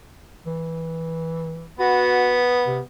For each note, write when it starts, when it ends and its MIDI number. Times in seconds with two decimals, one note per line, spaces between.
0.46 1.69 52
1.79 2.82 59
1.79 2.38 66
2.67 2.80 48